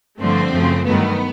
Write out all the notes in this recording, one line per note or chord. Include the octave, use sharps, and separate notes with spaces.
G2 D3 F3 A3 C4
F#2 C#3 F3 A3
G2 D#3 F#3 A3 B3